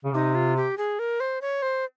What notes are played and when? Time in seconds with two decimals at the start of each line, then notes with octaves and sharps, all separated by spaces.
0.04 C#3
0.13 C3 D#4
0.35 F4
0.57 G4
0.78 G#4
0.99 A#4
1.20 C5
1.41 C#5
1.62 C5